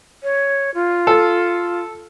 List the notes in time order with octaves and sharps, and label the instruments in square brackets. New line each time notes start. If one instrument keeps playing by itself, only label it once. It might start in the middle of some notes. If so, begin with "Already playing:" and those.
[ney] C#5
F4
[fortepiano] A4